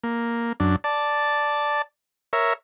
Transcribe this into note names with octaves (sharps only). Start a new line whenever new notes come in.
A#3
F#2 D4
D5 A5
A#4 C#5 E5